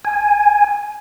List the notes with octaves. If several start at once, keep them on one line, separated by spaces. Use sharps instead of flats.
G#5